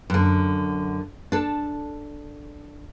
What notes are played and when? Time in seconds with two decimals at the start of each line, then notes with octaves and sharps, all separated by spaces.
0.10 F#2 D3
1.32 D4 A4